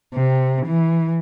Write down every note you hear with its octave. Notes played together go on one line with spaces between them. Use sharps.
C3
E3